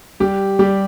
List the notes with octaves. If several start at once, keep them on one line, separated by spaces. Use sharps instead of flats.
G3 G4
G3 G4